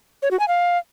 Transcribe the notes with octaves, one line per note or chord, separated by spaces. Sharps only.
C#5
F#4
G#5
F5